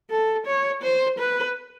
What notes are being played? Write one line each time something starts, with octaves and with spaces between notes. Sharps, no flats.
A4
C#5
C5
B4